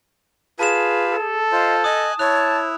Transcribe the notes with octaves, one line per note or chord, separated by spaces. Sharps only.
F4 G#4 B4 A5 E7
A4
F4 C5 D#5
D#5 G#5 D#6 F#6
E4 C#5 A5 F#6 F7